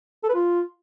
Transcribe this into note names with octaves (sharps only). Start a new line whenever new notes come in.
A4
B4
F4